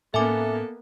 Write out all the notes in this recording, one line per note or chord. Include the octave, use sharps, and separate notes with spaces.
A2 A#3 B3 C#4 A4 E5 G#5 D6